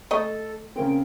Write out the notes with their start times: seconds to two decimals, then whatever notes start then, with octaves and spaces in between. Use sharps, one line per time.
0.11 A3 A4 D#5
0.76 C#3 A#3 C4 G5